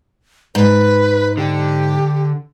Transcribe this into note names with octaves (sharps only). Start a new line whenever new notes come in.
G#2 B4
D3 G4